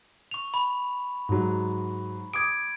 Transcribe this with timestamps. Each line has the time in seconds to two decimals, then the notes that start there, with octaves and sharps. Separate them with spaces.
0.31 C#6 F7
0.54 B5
1.29 G#2 F#3
2.34 D6 D#6 G#6 D7